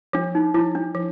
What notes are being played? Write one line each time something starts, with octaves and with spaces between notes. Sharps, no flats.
F3 D4
D#4
F3 E4
D4
F3